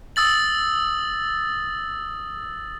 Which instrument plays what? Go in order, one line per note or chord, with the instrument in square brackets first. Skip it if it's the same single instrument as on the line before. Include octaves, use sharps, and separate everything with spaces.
[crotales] D#6 E6 A6 F#7